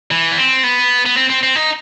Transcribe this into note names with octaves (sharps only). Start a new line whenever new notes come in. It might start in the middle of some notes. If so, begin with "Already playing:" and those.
E3
B3
C4
B3
B3
C4
C4
C4
D#4